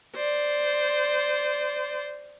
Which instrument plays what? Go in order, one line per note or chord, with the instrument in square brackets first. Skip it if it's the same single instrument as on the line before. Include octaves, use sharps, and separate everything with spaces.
[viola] C5 D5